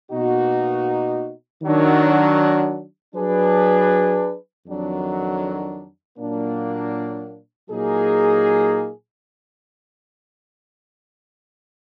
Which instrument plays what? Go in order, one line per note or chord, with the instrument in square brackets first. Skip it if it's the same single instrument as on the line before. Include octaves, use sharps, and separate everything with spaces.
[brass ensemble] B2 A#3 D#4 F#4
D#3 F#3 D4
F#3 D4 G#4 B4
F2 D#3 F#3 D4
A#2 F#3 A#3 D4
A#2 F#3 A#3 D#4 G#4